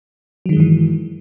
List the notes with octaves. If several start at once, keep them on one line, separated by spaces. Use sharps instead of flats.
G2 D#3 E3 F#3 G#3